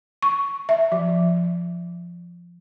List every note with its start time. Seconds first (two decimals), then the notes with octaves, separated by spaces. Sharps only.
0.22 C#6
0.69 E5
0.92 F3